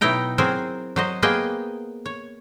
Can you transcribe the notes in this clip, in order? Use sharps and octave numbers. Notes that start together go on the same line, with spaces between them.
B2 F#3 D#4 E4 G5 A#5
F#3 C4 G#4 A#4 C5
F#3 C5 D#5
A#3 B3 G#4 C5 D#5 G5
C#5